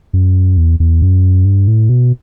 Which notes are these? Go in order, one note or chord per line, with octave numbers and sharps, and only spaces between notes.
F#2
E2
E2
F#2
G2
A2
B2